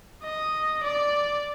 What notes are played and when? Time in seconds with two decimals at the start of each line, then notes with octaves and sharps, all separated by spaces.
0.23 D#5
0.84 D5